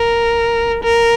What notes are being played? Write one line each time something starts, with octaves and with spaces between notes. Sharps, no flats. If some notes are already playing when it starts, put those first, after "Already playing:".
Already playing: A#4
A#4